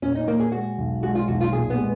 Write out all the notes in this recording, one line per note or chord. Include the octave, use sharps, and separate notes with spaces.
A#2 C#4
D#4
A#2 A#3
G#4
G#3 F#4
B1
G#3 F#4
F4
B1 F#4
F4
A#2 G#4
B3
G#3